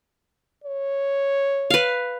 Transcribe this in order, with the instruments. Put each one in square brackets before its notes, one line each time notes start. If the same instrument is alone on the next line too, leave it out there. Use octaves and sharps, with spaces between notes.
[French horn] C#5
[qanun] B4 F5